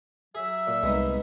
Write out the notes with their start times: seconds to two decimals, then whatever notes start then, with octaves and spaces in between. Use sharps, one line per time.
0.35 F#3 G#4 E5
0.67 A#2
0.83 C2 G#3 B3 D#4